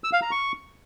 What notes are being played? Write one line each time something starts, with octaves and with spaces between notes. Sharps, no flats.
E6
F5
A#5
C#6